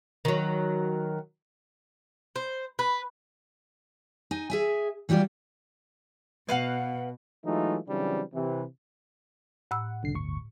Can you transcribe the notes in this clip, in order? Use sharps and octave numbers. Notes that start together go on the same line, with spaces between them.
D#3 F#3
C5
B4
D#4 G#5
G#4 E5 G#5
E3 F#3 G3 F4 D5
B2 B4 F5 F#5
E3 F#3 G#3 A3 D#4 F4
C#3 E3 F#3 G3 C4 D4
C3 E3
A2 F#5 B5 E6
C2 D3 C7
G1 D2 C#6